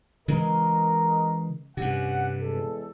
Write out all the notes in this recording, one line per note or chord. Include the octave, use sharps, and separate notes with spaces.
C#3 E3 G#3 A#4 D#5
G2 C3 C#4 F#5
E2 G#3 A4